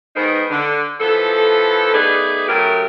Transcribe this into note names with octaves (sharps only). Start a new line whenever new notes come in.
D#3 G#3 B3 D#4 A#4 C5
D3
E3 F3 B3 A4
A3 B3 D#4 G#4 B4 D5
C#3 F#3 A3 G4 A#4